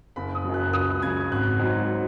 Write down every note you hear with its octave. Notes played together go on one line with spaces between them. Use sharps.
F#1 B5
D#6
F#2 F#3
F#6
C#2 D#6
C#3 F#3 G#6
G#1 F#6
G#2 F#3